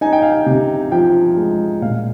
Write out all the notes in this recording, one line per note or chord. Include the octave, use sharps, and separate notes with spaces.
D#4 G#5
G5
F5
G5
C3
F3 G5
G#3
A#2 F5